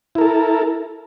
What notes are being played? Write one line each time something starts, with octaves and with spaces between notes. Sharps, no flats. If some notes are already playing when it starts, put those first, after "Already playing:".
E4 A4 A#4